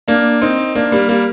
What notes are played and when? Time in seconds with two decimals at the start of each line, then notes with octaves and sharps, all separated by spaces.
0.08 A#3 D4
0.42 C4 D#4
0.75 A#3 D4
0.92 G3 A#3
1.09 G3 A#3